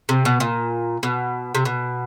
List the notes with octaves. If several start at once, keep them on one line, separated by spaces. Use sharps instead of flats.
C3
B2
A#2
B2
C3
B2